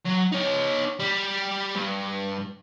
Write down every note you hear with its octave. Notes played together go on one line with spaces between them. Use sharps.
F#3
D#4 C#5
G3
G2